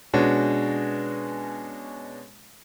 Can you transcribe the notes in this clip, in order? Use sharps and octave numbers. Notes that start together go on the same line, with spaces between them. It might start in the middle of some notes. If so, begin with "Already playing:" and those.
B2 G#3 C#4 D4 F#4